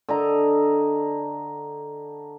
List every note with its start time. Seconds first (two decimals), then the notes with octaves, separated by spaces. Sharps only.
0.09 D3 D#5 A#5